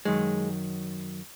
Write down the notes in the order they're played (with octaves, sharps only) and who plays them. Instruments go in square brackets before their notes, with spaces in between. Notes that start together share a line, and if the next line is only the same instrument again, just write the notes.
[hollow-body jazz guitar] F#2 D#3 F#3 G#3